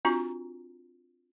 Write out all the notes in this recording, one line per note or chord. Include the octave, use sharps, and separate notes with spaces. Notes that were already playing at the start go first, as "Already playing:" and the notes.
C4 D4 F4 F#4 A#5